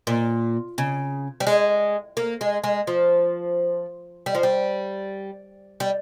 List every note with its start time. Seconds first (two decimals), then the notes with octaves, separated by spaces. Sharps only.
0.07 A#2
0.78 C#3
1.40 G3
1.47 G#3
2.17 A#3
2.41 G#3
2.64 G#3
2.87 F3
4.26 G3
4.35 F3
4.43 G3
5.80 G3